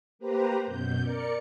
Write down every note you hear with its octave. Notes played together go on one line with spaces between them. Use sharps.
A#3 G4 B4 C5 A#5
F#2 B2 G6
A#4 D5 C#7